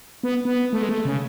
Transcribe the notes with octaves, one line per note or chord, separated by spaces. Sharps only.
B3
B3
A3
G#3
A3
C#3